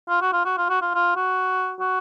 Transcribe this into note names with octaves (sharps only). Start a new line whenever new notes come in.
F4
F#4
F4
F#4
F4
F#4
F4
F4
F#4
F#4